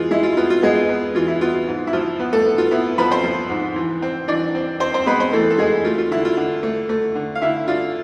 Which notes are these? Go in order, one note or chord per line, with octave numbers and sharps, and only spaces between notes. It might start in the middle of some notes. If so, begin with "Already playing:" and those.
Already playing: E3 G#3 B3 F4 G#4
G#3 E4
F4
B3 F4
F4
G#3 B3 G#4
B3
E3 F4
E4
B3 F4
F4
G#2
E4
F3 F4
B3
A3 A4
B3
F4
B3 E4
F3 B3 B4
C4 C5
F3
G#2
E3
C4
E3 D4 D5
C4
C4 C5
C4 C5
G#3 B3 B4
C4 C5
E3 A3 A4
A4
E3 G#3 G#4
A3 F4
F4
D3 E4
F4
D3
A3
A3
D3
F5
D3 E4 E5
D4 F4 F5